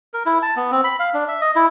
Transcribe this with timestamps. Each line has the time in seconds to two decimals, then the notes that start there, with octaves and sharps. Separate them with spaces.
0.14 A#4
0.26 E4
0.42 A5
0.56 B3
0.71 C4
0.84 B5
0.99 F5
1.14 D4
1.28 E5
1.41 D#5
1.56 E4